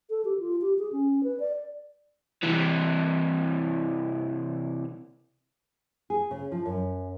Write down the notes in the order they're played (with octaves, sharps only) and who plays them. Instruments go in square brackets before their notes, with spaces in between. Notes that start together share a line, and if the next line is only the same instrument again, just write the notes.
[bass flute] A4
G4
F4
G4
G#4
C#4
B4
D5
[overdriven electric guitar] C3 E3
[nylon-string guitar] G#4
C#3
F3
F#2